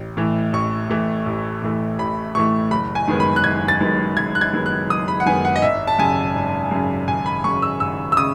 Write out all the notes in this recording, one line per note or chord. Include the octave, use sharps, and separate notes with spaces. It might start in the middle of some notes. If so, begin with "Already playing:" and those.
Already playing: A1
A2 E3 A3
A1 C#6
A2 E3 A3
A1
A2 E3 A3
A1 B5
A2 E3 A3 C#6
F#1 B5
G#5
F#2 D#3 G#3 B3
B5
F#6
F#1 G#6
A6
F#2 D#3 G#3 B3
F#1 G#6
F#6
G#6
F#2 D#3 G#3 B3
F#6
F#1 D#6
B5
F#5
F#2 D#3 G#3 B3 G#5
F#5
D#5
G#1 E5
A5
F#2 C#3 G#5
G#1
F#2 C#3
G#1 G#5
B5
F#2 C#3 C#6
E6
G#1 E6
E6
C#3 D#6